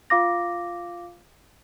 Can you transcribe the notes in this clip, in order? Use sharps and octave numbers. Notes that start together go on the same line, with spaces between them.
F4 F5 D6 A#6